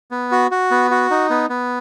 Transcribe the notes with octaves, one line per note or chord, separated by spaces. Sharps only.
B3
F#4
F#4
B3
F#4
D#4
B3
B3